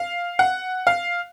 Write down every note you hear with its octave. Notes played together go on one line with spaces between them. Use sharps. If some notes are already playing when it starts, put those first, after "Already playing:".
Already playing: F5
F#5
F5